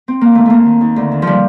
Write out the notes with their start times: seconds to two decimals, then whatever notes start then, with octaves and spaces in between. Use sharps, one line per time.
0.08 C4
0.21 A#3
0.35 D#3 A3
0.46 D#2 A3 A#3
0.65 D#3
0.81 D#2
0.96 D2
1.12 D#3
1.22 C3 F3 G3